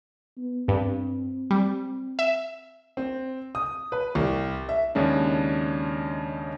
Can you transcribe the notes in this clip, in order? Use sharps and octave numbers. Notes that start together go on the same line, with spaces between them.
B3
G2 C4
G3
E5
C4
D#6
B4
C2
E5
D#2 C#3 G#3 C#4 D4